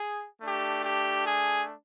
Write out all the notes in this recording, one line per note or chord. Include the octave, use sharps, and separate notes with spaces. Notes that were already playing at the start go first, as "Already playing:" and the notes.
Already playing: G#4
A3 D4 G4
G4
G#4